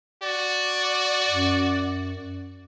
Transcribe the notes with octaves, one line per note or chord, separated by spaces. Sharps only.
F#4 D5
F#2